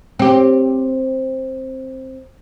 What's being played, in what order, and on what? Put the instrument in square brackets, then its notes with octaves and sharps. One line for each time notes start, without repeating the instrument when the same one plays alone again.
[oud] C4 G4